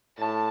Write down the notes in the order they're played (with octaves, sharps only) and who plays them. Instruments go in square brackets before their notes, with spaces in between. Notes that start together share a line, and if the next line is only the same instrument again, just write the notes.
[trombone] A2 [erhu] A5